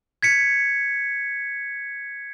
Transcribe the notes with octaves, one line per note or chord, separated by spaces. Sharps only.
G#6 B6 C#7